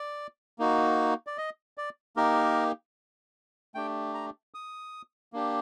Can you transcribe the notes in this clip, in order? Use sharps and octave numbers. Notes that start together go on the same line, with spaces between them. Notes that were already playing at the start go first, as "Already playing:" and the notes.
Already playing: D5
A#3 D#4 F#4
D5
D#5
D5
A#3 D#4 G4 A#4
A3 D4 G4 G5
A#5
D#6
A#3 D4 G4